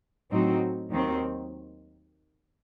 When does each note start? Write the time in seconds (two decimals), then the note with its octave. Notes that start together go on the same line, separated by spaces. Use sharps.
0.31 A2 F#3 C4 D#4 F#4
0.90 D#2 D#3 F#3 C4